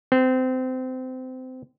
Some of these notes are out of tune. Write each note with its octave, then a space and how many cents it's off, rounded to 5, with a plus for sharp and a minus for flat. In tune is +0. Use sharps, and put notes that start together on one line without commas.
C4 -25